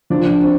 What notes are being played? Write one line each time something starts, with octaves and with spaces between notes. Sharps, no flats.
F3 D4
C4